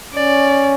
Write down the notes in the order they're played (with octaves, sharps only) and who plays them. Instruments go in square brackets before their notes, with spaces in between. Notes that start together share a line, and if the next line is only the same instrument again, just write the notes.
[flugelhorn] C#4 [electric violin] D5